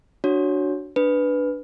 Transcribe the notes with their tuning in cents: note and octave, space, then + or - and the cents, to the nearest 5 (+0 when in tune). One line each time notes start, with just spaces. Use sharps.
D4 +0 F#4 +0 C#5 +0
D4 +0 B4 +0